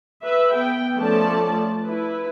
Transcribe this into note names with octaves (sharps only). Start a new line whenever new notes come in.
B4 E5
B3 G5
F3 A3 C#4 D5 A5
E4 B4